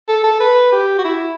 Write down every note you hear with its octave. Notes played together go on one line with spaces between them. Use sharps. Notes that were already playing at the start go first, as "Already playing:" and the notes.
A4
A4
B4
G4
F#4
E4